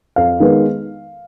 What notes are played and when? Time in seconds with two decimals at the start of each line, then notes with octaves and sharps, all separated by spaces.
0.16 F2 F5
0.40 D#3 G#3 B3